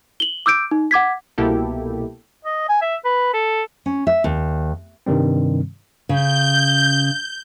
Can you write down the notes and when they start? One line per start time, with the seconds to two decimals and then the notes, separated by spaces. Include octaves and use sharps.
0.20 F#7 G7
0.46 D6 E6 G6 D7
0.71 D#4
0.91 F#5 D6 G#6 B6
1.38 C2 B2 A#3 E4 G4 A4
2.45 D#5
2.69 G#5
2.82 E5
3.05 B4
3.33 A4
3.86 C#4
4.07 E5
4.24 D#2
5.06 G2 C3 D#3 G3 C4
6.09 C#3 G6